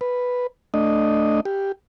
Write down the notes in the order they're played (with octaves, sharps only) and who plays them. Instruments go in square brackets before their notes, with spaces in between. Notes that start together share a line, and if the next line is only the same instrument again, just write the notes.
[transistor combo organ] B4
A3 D4 D#5
G4